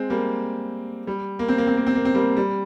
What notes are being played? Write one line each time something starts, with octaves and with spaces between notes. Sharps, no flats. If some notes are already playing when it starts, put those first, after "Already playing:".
Already playing: G#3 C4
G3 A#3
G3
A#3
C4
A#3
C4
A#3
C4
A#3
C4
G3 A#3
G3